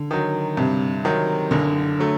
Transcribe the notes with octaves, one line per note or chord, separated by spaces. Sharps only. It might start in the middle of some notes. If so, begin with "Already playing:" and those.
Already playing: D3
D#3 F#3
G2 C3
D#3 F#3
F#1 D3
F#3 A3